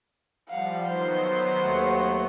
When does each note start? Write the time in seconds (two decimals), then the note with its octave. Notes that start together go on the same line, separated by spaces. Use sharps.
0.49 F3 G3 F5 F#5
0.86 D#3 F#3 B3 C5 C6
1.63 D#2 A3 F#5